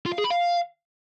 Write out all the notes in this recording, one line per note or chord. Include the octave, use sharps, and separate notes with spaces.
F4
F5
G#4
B5
F5